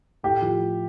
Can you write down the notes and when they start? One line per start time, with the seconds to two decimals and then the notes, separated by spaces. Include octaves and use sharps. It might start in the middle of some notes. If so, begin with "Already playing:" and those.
0.23 A2 G4
0.42 F3